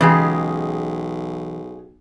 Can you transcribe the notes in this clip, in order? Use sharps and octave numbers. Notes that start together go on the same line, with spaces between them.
B1 C#3 E3 G#3 G4